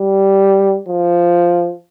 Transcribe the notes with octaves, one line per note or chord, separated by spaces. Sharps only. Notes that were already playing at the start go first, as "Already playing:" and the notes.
Already playing: G3
F3